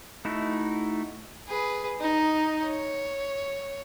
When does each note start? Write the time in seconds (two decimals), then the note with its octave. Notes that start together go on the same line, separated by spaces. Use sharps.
0.25 A3 D#4 E4 F#4
1.48 G#4 B4
2.00 D#4
2.65 C#5